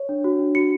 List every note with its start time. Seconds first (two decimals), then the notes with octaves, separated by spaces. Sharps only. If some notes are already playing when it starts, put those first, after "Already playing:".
Already playing: C#5
0.09 D4
0.24 F#4
0.39 D4
0.55 F#4 C#7